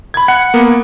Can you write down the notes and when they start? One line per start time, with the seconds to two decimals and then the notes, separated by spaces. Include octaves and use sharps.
0.14 B5 G#6
0.28 F#5
0.54 A#3 B3